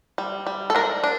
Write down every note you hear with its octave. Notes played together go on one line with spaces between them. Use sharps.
G3
G3
A4
D4 A#4
D4